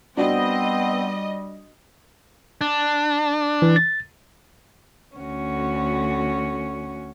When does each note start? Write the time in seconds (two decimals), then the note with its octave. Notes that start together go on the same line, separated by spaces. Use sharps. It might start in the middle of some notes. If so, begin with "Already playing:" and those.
0.17 G3 B3 C4 D4 F#4 D#5
2.61 D4
3.62 E3
3.76 A6
5.17 D2 C#4 F#4